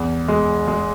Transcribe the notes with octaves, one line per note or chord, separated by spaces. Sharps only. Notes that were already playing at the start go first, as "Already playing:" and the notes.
Already playing: E2
G#3
G#3